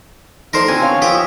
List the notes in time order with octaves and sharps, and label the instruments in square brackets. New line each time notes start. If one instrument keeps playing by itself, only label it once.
[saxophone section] A2 D3 [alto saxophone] D#4 [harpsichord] A#4 C5
[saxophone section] B2 D3 [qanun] C4 G#5
[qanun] C#5 [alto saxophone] F5
[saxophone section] D#2 E3 F3 [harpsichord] G4 [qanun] D#5 E5